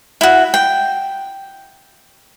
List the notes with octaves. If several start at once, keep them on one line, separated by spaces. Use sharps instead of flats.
E4 F#4
G5